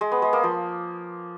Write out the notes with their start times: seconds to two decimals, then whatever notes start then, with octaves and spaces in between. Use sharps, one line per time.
0.01 G#3
0.12 B3
0.22 G#3
0.33 A#3
0.43 F3